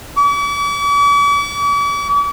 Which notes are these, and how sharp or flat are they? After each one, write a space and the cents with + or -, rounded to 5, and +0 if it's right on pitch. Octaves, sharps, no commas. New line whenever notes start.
D6 -45